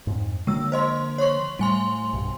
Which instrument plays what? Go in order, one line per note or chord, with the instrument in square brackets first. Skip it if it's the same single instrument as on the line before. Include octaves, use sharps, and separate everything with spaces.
[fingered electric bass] F2 G#2
[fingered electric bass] D3 F3 A#3 [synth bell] G#3 E6
[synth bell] C5 D#5 C6
C#5 C6 C#6
[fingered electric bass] A2 [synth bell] G3 G#5 C6
[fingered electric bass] B1 G2